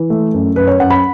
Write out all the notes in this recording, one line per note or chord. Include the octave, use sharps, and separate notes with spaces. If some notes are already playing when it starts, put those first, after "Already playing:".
Already playing: E3
A3
F#2
F#2 B4
C#5
F#2 F#5
B5